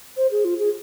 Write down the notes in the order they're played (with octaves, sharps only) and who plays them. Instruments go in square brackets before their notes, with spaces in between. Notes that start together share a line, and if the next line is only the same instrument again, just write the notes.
[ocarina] C5
G#4
F4
G#4